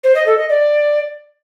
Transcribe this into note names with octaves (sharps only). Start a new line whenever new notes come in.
C5
D#5
A4
D#5
D5